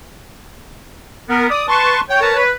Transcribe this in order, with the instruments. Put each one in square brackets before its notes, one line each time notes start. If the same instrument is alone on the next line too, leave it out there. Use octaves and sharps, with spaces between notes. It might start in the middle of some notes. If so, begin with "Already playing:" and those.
[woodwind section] B3 [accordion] A#4
[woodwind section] D5 [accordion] D#6
[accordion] B4 C6 C#6 [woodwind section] A5
[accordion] C#5 [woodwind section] G5
[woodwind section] A#4 B4 A5
B4